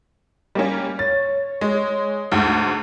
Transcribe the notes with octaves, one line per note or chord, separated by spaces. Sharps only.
G3 A#3 C#4
C#5 A6
G#3
D2 G#2